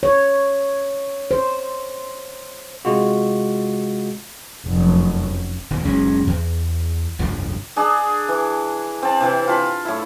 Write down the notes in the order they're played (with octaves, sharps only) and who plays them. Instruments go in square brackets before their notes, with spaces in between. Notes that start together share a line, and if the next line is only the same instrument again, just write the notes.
[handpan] C#5
C5
[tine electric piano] C3 G#3 F4 F#4
[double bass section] F1 F#2
[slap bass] D#1 E2
F#1 B1 G#3 C#4
E2
F1 C2 G2 F3
[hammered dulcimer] D4 G#4
E3
C4 A5
C3 E3
F4 A5 B5
A2 E4